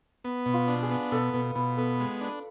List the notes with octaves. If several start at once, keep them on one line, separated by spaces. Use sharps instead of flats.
B3
B2
F4
D4
G#4
B3
B2 A4
B2 B4
B2 B4
B3 A4
G#3
D4